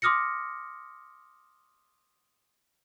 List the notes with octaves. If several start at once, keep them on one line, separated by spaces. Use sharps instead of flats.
C6 D6 D#6 F6 A#6 C#7